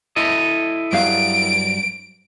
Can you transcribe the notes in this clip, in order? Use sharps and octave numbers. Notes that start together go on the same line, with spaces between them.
E4 A4 D#5
G2 F#3 F5 D7